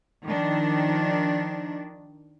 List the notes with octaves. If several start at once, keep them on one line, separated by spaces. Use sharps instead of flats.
D#3 F3 D4